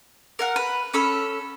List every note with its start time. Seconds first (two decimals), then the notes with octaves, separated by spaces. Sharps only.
0.39 A#4 F5 F#5
0.56 B4
0.93 C#4 A4 B5 E6